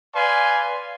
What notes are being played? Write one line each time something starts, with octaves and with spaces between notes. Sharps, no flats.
B4 D5 F5 G#5 C6